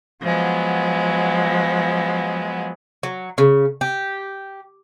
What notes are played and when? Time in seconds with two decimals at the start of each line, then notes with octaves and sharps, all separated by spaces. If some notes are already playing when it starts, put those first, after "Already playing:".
0.21 F3 F#3 G#3 B3
3.03 F#3
3.38 C#3
3.81 G4